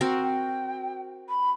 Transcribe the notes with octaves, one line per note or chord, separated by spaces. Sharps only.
C4 F#4 A#4
G5
B5